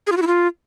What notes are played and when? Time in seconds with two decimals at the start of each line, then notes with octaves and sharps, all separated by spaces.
0.07 G#4
0.12 F4
0.17 F#4
0.22 E4
0.27 F4